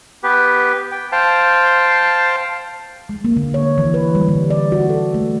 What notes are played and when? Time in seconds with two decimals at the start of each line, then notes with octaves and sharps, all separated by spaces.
0.23 B3 G4 B4
0.92 G5
1.12 C5 F5 G5 A5
3.09 G#3
3.25 A#3
3.37 D3
3.54 C#5
3.78 E3
3.94 B4
4.15 G3
4.28 D3
4.50 D5
4.72 F#4
4.89 A4
5.14 A3